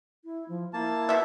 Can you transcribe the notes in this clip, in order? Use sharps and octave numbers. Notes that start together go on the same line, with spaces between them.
E4
F3
A#3 E4 A5
B2 E5